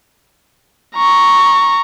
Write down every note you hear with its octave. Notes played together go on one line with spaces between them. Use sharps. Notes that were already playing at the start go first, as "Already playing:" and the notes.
A#5 C#6